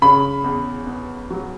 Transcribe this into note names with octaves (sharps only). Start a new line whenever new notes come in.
C#3 B5
E2
B3
F#3